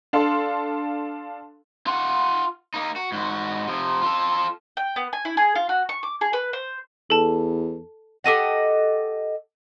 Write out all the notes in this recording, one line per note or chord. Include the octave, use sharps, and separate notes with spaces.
D4 A4 F5 C6
F4 F#5
A#3 D#4
F#4
G#2 F#4
C3 F3
F4 A4
G5
B3
G#5
E4
G#4
F4
F#4
C#6
D6
G#4
B4
C5
E2 A4 A5
G4 A4 D#5 F#5